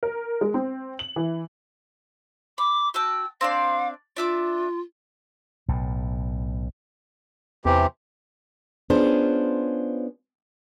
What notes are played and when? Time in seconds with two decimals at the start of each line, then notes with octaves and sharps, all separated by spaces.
0.03 A#4
0.41 G#3
0.54 C4
0.99 F#7
1.16 E3
2.58 B5 D6
2.94 F#4 G5 A5 E6
3.41 C4 D4 D5 F5
4.17 D4 F4 E5 D6
5.68 B1 A2
7.65 E2 C3 E3 G4
8.90 B3 C#4 D4 F4 G#4 C5